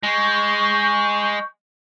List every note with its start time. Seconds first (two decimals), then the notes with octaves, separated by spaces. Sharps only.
0.03 G#3 C#6 G6